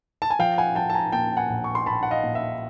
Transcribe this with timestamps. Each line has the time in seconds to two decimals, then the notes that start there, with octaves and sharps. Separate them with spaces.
0.22 A5
0.30 G#5
0.39 F3 F5 G5
0.58 F#5 G#5
0.75 F3 G5 A5
0.90 A5
0.94 G#5 A#5
1.13 A#2 G5 A5
1.37 F#5 G#5
1.49 A#1
1.64 C#6
1.75 C6
1.86 A#1 A5 B5
2.03 F#5
2.11 D#5 F5
2.23 A#2
2.35 E5